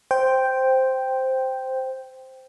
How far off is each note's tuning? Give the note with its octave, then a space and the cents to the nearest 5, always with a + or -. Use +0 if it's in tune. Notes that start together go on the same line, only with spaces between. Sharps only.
C5 +0 G5 +0